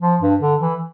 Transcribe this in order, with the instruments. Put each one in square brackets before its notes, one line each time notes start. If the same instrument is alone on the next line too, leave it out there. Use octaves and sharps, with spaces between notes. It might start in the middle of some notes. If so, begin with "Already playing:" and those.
[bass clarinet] F3
G2
D3
E3